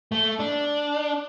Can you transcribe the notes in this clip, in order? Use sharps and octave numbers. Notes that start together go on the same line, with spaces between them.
A3
D4